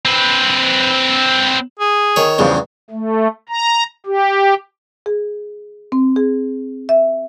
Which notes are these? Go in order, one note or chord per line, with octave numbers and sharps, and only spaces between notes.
C4 B4
G#4
D#3 C#5
E2 G2 C#3 F3
A3
A#5
G4
G#4
C4
G#4
E5